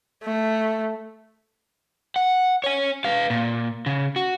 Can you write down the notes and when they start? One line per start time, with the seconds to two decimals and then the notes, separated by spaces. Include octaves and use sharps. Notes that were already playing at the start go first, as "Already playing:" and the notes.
0.24 A3
2.16 F#5
2.64 C#5 G#5
3.05 B4 F5
3.30 A#2
3.86 C#3
4.16 F#4